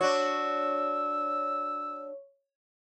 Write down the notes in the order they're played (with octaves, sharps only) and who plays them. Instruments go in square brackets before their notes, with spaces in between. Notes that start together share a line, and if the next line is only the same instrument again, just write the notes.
[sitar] D4 F#4 [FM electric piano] C#5 [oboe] E6